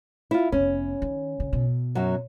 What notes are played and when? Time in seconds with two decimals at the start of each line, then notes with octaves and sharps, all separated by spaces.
0.31 E4 F4
0.52 F1 B3 C#4
1.02 D#3
1.40 C#3
1.53 B2
1.95 F#2 F#3